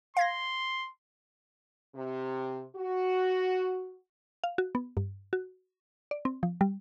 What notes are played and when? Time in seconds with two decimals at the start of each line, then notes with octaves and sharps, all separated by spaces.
0.17 F5 C6 G#6 A#6
1.95 C3
2.76 F#4
4.44 F5
4.58 F#4
4.75 B3
4.97 G2
5.33 F#4
6.11 D5
6.25 C4
6.43 F3
6.61 G3